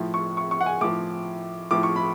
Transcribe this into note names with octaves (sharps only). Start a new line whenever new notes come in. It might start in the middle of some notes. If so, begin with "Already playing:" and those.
Already playing: A2 F3
C#6
C#6
C#6
F#5
G#5
A2 F3 D6
A2 F3 D6
C#6
B5